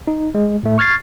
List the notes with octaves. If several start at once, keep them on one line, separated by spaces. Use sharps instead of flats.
D#4
G#3
A2 A3
C#6 F6 G#6 A6 C7